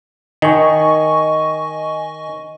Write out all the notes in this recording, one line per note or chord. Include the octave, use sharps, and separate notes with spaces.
D#3 D#5 G#5 C#6